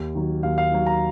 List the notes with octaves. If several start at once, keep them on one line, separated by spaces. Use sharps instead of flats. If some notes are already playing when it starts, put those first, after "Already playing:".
Already playing: D#2
D#3 F#3
D#2 F5
F5
D#3 F#3
A#5